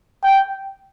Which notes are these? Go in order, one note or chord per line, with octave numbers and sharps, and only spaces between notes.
G5